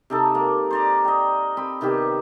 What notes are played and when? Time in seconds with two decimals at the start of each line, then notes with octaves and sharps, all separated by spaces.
0.10 C3 D#4 A4
0.35 A#3
0.71 C5 D5 A#5
1.05 D#5 G5
1.57 C4 B5
1.81 C3 D#3 B3 G4